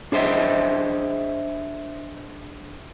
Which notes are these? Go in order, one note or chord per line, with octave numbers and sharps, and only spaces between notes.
D4 G#4 C5 D#5 E5